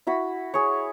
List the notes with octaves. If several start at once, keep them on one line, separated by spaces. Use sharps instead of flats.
E4 F#4 B5
G#4 C#5